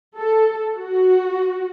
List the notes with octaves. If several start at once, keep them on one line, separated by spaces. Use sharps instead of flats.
A4
F#4